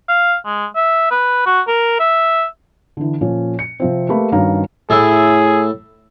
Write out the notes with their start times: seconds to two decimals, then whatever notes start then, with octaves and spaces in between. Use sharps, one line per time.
0.09 F5
0.45 G#3
0.76 E5
1.11 B4
1.46 F#4
1.68 A#4
1.99 E5
2.97 D3 E3
3.21 A#2 F3 C#4
3.59 C#7
3.80 C3 F3 C4
4.09 A3 A#3 G4 B4 B5
4.32 G2 D#3 C#4 F#4 F5 A#5
4.90 A2 E4 G#4 E5